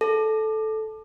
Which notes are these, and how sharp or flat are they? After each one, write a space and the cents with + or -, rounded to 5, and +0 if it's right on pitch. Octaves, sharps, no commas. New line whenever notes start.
A4 -10